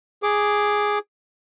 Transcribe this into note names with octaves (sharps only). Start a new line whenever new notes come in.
G#4 D6